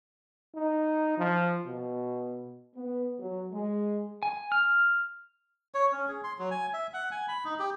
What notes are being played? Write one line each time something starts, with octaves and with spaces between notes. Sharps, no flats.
D#4
F3
B2
B3
F#3
G#3
G#5
F6
C#5
C#4
G#4
C6
F#3
G#5
E5
F#5
G#5
B5
D#4
G4